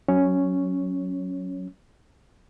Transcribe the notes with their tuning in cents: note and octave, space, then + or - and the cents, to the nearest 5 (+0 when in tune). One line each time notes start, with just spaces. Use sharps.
F#3 +0 C#4 +0 C#5 +0